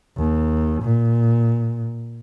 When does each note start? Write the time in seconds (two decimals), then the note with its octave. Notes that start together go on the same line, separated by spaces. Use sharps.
0.17 D#2
0.83 A#2